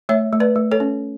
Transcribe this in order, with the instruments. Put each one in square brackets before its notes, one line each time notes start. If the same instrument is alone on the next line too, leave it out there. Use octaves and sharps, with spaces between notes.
[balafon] A3 C#5 E5
A3
B4 D5
A3
A4 C#5
C#4